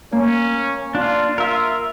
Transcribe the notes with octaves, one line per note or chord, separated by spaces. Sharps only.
A#3 C#4
D4 F4
F4 A#4 E5